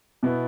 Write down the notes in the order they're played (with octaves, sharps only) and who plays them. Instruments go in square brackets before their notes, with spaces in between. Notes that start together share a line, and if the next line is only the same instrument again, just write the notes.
[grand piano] B2 B3 E4